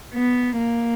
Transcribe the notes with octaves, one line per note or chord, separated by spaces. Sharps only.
B3
A#3